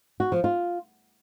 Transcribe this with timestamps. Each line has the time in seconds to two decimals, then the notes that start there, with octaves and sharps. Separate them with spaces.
0.20 F#4
0.32 F3
0.44 F4